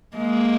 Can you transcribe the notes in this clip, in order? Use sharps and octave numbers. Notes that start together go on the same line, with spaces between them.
G#3 A#3